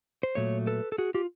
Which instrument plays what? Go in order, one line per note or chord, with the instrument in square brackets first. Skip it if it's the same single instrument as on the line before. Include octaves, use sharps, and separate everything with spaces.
[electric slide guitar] C5
A#2 F#3 A3 C#5
A4 B4
A4
F#4 G#4
F4 G4